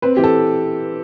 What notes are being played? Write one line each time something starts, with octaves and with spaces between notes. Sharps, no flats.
C4 B4
E3 G4
A4